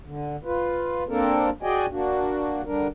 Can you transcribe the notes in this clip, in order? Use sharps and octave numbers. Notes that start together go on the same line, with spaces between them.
D3
F4 B4
A#3 C4 D4 A4 A#4
F#4 G#4 D5 D#5 G5 G#5
A#3 D4 F#4
D3 G3 D4 A#4